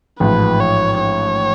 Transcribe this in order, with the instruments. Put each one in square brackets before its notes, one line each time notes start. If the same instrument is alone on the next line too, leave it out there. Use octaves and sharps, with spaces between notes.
[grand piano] A1 G#2 F3 [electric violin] B4
[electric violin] C#5
C#5